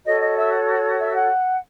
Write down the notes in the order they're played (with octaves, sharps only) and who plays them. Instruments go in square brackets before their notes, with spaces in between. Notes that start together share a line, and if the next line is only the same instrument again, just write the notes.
[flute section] F#4 A4 C#5 D#5
D#5
E5
E5
F#5